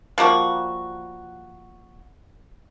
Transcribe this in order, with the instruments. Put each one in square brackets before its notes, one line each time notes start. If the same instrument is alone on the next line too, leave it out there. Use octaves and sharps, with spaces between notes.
[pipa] F3 G3 A#3 F#4